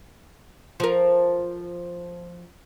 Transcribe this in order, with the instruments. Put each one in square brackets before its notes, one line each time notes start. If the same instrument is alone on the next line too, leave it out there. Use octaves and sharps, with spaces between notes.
[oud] F3 A#4